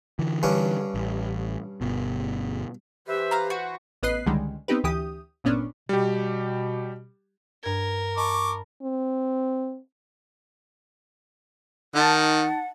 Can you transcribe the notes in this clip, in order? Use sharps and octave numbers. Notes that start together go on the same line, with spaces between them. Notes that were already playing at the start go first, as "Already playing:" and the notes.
D3 E3
G2 C#4 D4
A1
G1 B2
E3 G4 B4 C5 E5
F5 A#5
F#4 F#5
A1 B3 B4 D#5 F#6 C7
C#2 D3 D#3 G3 G#3
B3 C4 D#4 G4 B4
D2 E3 G4 D#6
G1 A#2 B3 C#4 D4
B2 G3 G4
G2 A#4 G#6
D#5 A5 B5 C#6 D6
C4
D#3 D#4 F#5 A5 A6